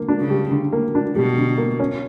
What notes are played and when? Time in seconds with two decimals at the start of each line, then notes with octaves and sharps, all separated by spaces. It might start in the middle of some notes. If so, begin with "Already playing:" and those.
Already playing: D3 A#3
0.08 D4
0.20 C#3
0.30 G3
0.52 D3
0.72 A#3
0.95 D4
1.16 B2 G3
1.37 D3
1.58 A#3
1.80 C#4